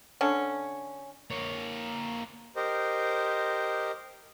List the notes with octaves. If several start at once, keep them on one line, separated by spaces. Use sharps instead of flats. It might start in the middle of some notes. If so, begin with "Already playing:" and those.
D3 C#4
A#3 C#5
G4 A#4 C5 D#5